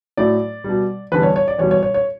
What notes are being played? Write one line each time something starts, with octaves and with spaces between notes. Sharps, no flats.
A2 F#3 A3 D5
B2 G3
E2 D3 G3 B4
C#5
C#5
D5
E2 B2 G3 C#5
C#5
C#5
C#5